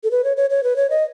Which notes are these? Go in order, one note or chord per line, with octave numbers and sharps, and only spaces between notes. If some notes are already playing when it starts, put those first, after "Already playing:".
A4
B4
C#5
C#5
C#5
B4
C#5
D#5